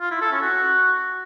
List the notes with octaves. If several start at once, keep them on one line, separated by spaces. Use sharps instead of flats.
F4
E4
A4
C#4
F#4